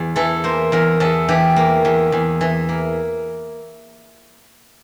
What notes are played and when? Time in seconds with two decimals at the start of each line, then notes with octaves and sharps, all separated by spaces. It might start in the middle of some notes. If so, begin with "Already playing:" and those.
Already playing: E2
0.16 E3 A4
0.44 A#3 C5
0.72 E2 A#4
1.00 E2 A4
1.29 E3 G4
1.56 A#3
1.85 E2
2.12 E2
2.41 E3
2.69 A#3